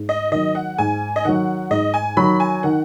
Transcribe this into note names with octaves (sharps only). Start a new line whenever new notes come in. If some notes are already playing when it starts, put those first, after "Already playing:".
Already playing: G#2
D#5
D#3 F#3 D#5
F#5
G#2 G#5
D#5
D#3 F#3 F#5
G#2 D#5
G#5
D#3 F#3 B5
G#5
D#3 F#5